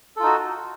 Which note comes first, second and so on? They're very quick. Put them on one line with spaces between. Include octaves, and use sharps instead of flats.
A4 F4 D#4 F#4